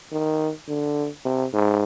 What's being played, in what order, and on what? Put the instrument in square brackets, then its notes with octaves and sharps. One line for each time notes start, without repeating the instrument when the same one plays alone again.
[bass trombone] D#3
D3
C3
G#2